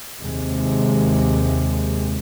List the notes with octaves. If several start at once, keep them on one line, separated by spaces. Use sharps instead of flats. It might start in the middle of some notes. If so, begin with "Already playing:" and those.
D#2 C3 G#3